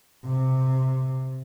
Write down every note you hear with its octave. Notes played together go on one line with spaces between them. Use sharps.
C3